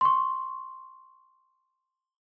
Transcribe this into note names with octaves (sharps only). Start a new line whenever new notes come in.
C6 C#6